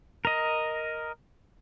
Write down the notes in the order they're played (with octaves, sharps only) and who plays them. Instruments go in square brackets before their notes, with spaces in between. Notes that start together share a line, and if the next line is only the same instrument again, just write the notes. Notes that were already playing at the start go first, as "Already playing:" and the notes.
[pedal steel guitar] A#4 D#5